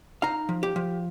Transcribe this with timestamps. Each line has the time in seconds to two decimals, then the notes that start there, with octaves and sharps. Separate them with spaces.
0.22 D#4 F5 A#5
0.49 F3
0.63 G4
0.76 F3